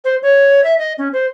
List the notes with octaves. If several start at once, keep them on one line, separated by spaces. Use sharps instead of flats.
C5
C#5
E5
D#5
C#4
C5